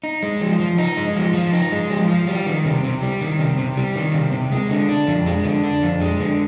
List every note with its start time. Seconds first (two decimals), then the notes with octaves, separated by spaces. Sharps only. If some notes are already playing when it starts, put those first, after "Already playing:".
0.04 D#4
0.23 G#3
0.41 F3
0.60 F3
0.78 D#4
0.97 G#3
1.16 F3
1.34 F3
1.53 D#4
1.72 G#3
1.90 F3
2.09 F3
2.27 G3
2.46 D#3
2.65 C3
2.84 C3
3.02 G3
3.21 D#3
3.39 C3
3.59 C3
3.77 G3
3.96 D#3
4.14 C3
4.33 C3
4.52 G#3
4.70 D3
4.89 D4
5.07 F2
5.26 G#3
5.45 D3
5.63 D4
5.83 F2
6.02 G#3
6.20 D3